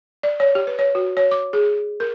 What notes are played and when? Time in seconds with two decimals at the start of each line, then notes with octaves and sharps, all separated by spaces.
0.23 D5
0.40 C#5
0.55 G4
0.67 B4
0.79 C#5
0.95 F#4
1.17 C#5
1.31 D6
1.53 G#4
2.00 A#4